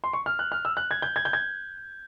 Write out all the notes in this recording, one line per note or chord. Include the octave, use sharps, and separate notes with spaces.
C6
C#6
F6
F#6
F6
E6
F#6
G#6
G6
G#6
G6
G#6